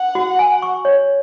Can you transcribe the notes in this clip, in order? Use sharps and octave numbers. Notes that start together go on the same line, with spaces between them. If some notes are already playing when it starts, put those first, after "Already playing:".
Already playing: F#5
F#4
G#5
C#6
C#5